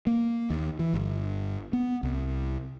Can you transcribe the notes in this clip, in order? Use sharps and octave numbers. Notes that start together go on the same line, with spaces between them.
A#3
D#2
E3
G1
B3
C2